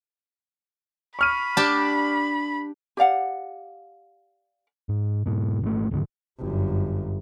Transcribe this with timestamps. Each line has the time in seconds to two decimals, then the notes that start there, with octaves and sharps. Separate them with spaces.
1.19 B5 C#6 F6 D#7
1.57 D4 G4 A5
2.97 G4 D5 F5 F#5
4.89 G#2
5.26 G#2 B2
5.62 G#1 G#2 D#3 A3
5.91 D#1 C#2 G#2 D3
6.39 G1 F#2